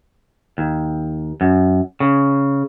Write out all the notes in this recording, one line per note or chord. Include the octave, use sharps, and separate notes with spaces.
D#2
F#2
C#3